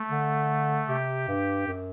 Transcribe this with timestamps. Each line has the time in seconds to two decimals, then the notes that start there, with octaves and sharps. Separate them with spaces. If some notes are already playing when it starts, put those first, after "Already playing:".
Already playing: A3
0.10 D3
0.88 C3 G4
1.28 G2
1.67 F#2